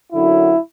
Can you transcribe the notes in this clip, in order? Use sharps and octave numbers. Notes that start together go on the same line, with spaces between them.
F#2 D3 F#3 E4